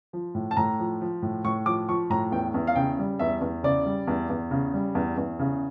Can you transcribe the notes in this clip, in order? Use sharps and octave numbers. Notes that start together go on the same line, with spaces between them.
F3
A2
A5
A2 A#5
F3
F3
A2
A2 C#6
F3 D6
F3 C#6
A2 A#5
E2 G5
E2
F5
C#3 G5
G3
E2 E5
E2
C#3 D5
G3
E2
E2
C#3
G3
E2
E2
C#3